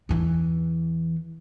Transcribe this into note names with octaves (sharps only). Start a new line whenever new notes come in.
E2 E3